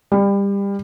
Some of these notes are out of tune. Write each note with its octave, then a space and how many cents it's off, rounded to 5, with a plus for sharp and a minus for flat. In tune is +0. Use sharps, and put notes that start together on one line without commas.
G3 +25